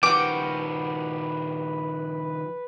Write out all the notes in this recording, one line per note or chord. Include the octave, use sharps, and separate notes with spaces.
D#3 F3 F#4 G4 B4 D6